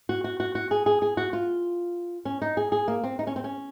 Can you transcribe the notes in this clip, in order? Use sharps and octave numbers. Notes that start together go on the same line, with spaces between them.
F#4
F#4
F#4
F#4
G#4
G#4
G#4
F#4
F4
C#4
D#4
G#4
G#4
A#3
C4
D#4
C#4
C4
C#4